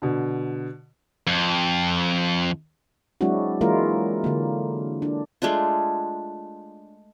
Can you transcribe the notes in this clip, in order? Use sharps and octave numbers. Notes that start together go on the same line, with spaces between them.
B2 D3
F2
F#3 G#3 C4 D4 E4 F#4
E3 G#3 A#3 E4 F4 A#4
D3 A#3
D4
G#3 A3 D4 F4